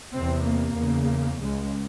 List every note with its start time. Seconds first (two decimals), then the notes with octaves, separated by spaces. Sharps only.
0.13 E2 C3 C4
0.45 A#3
0.76 E2 C#3
1.40 C#2 C#3 G#3